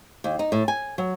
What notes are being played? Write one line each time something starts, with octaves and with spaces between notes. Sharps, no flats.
D#2
D#4
A2
G#5
F#3